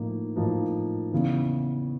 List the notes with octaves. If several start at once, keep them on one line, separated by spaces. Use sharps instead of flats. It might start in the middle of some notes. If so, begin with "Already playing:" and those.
Already playing: A2 F3 A#3 D#4
A2 F3 A#3 D#4
E2 C#3 E3